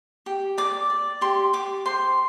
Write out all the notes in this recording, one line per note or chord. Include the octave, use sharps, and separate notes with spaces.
G4
D5 D6
D5
G4 C6
G4 D6
C5 C6